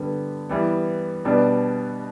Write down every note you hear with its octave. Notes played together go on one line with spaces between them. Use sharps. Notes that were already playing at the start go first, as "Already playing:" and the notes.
Already playing: D3 G3 B3
E3 G3 B3
B2 G3 B3 D4